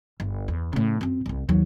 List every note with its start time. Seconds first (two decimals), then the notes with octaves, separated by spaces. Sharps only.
0.20 G1
0.48 E2
0.73 A2 C#3
1.01 F#2 C4
1.26 D1 C2
1.49 D#2 F#3